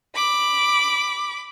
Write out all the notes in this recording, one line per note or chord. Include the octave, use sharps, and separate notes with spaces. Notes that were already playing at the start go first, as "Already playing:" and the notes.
B5 D6